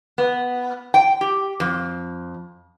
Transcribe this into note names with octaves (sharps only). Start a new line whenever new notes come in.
B3
G5
G4
F2